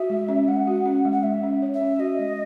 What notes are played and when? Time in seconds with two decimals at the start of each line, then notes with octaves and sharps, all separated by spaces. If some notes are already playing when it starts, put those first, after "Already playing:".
Already playing: F#4 E5
0.10 G#3
0.29 C#4
0.48 G#3 F#5
0.67 F#4
0.85 C#4
1.05 G#3
1.12 F#5
1.23 G#3 E5
1.43 C#4
1.62 C#5
1.74 E5
1.81 C#4
1.99 F#4 D#5
2.19 G#3